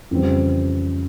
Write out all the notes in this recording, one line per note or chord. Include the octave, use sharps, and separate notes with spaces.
F2 C#3 E3 G3 C4